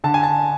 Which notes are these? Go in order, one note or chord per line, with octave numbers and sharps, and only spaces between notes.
D3 A5
G#5
A5